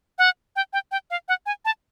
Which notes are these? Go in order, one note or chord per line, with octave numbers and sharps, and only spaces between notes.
F#5
G5
G5
G5
F5
F#5
G#5
A5